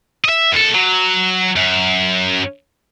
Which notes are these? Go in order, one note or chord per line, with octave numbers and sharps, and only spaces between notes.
D#5 E5
D#2 A4
F#3
F#2